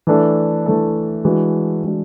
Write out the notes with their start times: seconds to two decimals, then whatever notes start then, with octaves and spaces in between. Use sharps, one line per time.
0.07 E3 A3 D4 A4
0.66 E3 A3 D4 A4
1.25 E3 G#3 D4 F#4
1.84 E3 G#3 D4 F#4